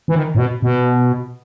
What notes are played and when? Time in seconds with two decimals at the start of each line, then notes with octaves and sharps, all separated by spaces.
0.08 E3
0.15 D#3
0.35 A2
0.38 B2
0.62 B2